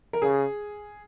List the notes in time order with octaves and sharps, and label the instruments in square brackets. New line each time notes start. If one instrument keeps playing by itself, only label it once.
[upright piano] A#4
[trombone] C#3 [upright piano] G#4